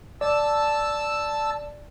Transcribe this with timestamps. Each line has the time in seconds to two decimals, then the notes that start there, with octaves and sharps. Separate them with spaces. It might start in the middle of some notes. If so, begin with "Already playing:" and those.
0.21 D5 A5 E6